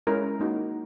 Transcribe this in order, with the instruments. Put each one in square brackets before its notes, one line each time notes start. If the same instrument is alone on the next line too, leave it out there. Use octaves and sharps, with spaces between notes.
[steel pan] G#3 C#4 E4 A#4
A#3 D#4 F#4